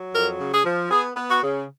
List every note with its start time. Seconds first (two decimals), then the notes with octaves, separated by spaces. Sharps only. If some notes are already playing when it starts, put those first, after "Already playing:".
Already playing: F#3
0.14 F2 A#4
0.40 C#3
0.52 G#4
0.64 F3
0.91 B3 G#4
1.17 B3
1.30 F#4
1.42 C#3